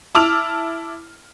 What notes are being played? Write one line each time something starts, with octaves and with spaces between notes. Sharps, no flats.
E4 A5 D6 E6 F6 F7